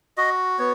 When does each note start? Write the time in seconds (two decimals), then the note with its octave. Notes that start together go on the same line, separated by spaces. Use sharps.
0.17 F#4 D#5
0.59 B3 C#5